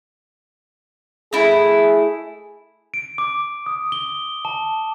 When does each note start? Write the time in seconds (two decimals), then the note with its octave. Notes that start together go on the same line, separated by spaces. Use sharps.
1.33 A3 E4 G#4
2.94 D7
3.18 D6
3.66 D#6
3.92 G7
4.45 A5